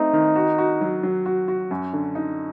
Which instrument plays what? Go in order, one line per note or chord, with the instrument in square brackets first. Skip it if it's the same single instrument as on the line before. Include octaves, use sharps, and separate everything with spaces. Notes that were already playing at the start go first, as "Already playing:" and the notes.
Already playing: [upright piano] A3 C4 [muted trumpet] D#4
[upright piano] D#3
F#4
F#4
F#3
F#3
F#4
F#4
F#2
D3
D#4